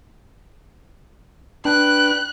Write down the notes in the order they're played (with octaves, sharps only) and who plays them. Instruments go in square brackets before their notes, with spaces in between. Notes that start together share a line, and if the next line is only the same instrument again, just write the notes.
[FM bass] D4 [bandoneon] B4 G5 [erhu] F#6